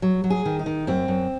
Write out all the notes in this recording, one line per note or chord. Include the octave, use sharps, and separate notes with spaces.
F#3
F#3
G#4
D#3
D#4
D#3
F#2 C4
F#2